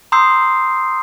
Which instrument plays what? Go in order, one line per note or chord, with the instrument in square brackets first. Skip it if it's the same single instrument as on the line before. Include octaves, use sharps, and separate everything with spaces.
[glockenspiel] A#5 C6 D#6 E6 G6 C7